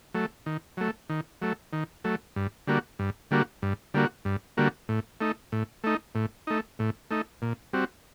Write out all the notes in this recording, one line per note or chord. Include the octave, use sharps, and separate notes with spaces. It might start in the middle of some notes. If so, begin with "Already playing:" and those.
F#3 A3
D#3
F#3 A3
D#3
F#3 A3
D#3
F#3 A3
G2
D3 G3 A#3 F#4
G2
D3 G3 A#3 F#4
G2
D3 G3 A#3 F#4
G2
D3 G3 A#3 F#4
A2
A3 D#4
A2
A3 D#4
A2
A3 D#4
A2
A3 D#4
A#2
G3 C4 F#4